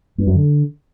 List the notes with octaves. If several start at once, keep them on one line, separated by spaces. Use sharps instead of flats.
G2
F#2
D3